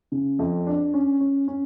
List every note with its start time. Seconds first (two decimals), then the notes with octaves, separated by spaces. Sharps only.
0.12 C#3
0.39 F2
0.67 D4
0.94 C#4
1.21 C#4
1.48 C#4